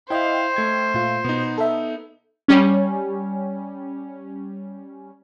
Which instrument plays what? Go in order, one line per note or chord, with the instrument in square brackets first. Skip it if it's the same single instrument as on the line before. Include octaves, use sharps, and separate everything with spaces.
[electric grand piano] E4 F5 [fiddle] C5 [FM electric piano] D#5 G5
[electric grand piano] A3 G#6
[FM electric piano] A#2 F4
[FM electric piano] B2 [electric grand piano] B3 D#4
[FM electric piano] A4 E5
[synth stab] G3 C#4